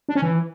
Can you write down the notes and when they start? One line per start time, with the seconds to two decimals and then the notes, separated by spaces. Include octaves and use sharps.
0.09 D4
0.15 C#4
0.22 E3